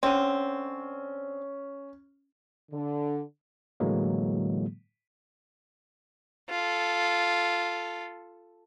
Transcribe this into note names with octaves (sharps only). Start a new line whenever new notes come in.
D3 C4 C#4
D3
A2 D3 E3 F#3 G#3 A#3
F4 A4